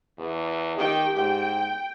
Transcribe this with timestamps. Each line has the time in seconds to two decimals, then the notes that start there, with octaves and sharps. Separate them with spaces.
0.18 E2
0.76 D#3 G4 G5
1.17 G#2 G5